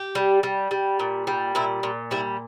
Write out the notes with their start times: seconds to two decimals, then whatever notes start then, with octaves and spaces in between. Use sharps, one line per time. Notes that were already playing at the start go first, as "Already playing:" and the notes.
Already playing: G4
0.15 G3
0.43 G3
0.71 G3
1.00 A#2
1.27 G3
1.55 A#2 E4
1.83 A#2
2.11 G3 E4